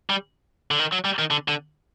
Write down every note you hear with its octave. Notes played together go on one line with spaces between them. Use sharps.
G3
D3
D#3
F#3
G3
D#3
D3
D3